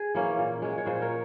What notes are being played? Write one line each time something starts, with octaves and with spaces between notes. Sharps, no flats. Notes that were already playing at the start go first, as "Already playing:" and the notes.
Already playing: G#4
E3 A#3 C#4
A#2
G#3 C#4
C#5
A#2 G#4 C5
A#4 C#5